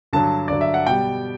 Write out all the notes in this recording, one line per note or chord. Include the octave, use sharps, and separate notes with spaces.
G2 D3 F#3 A5
G2 D3 F#3 D5
E5
F#5
B2 G3 G5